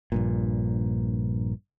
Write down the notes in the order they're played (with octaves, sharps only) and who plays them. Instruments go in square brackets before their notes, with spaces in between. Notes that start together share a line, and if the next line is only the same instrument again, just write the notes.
[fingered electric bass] A#1 G2 A#2